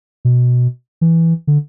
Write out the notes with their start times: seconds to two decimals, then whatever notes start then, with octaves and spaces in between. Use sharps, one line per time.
0.25 B2
1.01 E3
1.47 D3